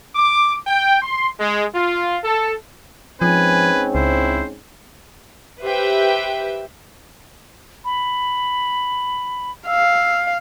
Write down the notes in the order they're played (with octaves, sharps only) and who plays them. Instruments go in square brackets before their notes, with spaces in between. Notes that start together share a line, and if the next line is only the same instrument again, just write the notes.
[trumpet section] D6
G5
C6
G#3
F4
A4
[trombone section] G#2 C4 C#4 [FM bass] F3 [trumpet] B4 [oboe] G#5
[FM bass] C#2 [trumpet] E4 [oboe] C5
[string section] G4 B4 C5 E5 G5
[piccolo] B5
[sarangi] F5 [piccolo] E6